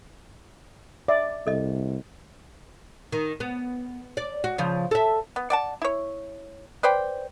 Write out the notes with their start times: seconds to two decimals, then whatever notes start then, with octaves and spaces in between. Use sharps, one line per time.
1.08 D5 E5
1.47 C2 A4 D#5
3.12 D#3
3.40 B3
4.17 D5
4.44 F#4
4.58 C#3 F3
4.91 A4 E5
5.36 B3
5.50 D5 F#5 A5
5.82 E4 C#5
6.83 B4 C5 D5 G5